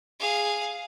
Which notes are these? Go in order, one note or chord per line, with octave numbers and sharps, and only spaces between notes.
G#4 F5